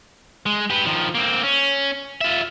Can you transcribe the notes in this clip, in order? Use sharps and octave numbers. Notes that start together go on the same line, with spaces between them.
G#3
G4 B4
D#3 F3
A#3 C4
C#4
F4 E5